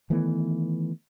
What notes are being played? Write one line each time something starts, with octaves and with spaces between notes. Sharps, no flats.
D#3 E3 A3 B3